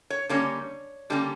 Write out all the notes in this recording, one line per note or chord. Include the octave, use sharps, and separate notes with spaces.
C#5
D3 G3 A#3 C#4 C#5
D3 G3 A#3 C#4